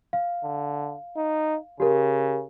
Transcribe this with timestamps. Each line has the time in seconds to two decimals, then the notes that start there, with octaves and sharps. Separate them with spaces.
0.13 F5
0.43 D3
1.17 D#4
1.80 C#3 G4 A#4